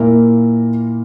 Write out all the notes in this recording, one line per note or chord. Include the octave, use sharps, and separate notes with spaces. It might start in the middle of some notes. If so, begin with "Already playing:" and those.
Already playing: A#2 A#3 E4 A#4